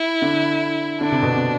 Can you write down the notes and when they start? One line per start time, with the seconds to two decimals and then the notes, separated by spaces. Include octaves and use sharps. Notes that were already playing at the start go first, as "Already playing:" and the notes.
Already playing: E4
0.22 D3
1.01 D3 D4
1.12 C3
1.22 B2
1.33 C3